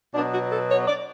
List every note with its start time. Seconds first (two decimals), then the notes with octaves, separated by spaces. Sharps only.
0.15 B2 F#3 B3 D4
0.33 F#4
0.52 A4
0.70 C#5
0.88 D5